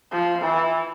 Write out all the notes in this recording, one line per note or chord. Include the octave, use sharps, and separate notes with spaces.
F3
E3